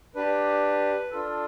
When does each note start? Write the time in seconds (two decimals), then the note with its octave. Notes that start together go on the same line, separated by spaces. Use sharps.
0.15 D4 G4 B4
1.11 D4 F4 A4